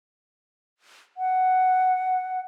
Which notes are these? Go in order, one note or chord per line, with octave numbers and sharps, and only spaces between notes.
F#5